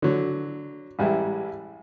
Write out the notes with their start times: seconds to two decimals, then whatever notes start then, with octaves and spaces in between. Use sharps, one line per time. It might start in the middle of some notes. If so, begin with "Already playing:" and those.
0.02 D3 F#3
0.99 A1 G3 G#3 E4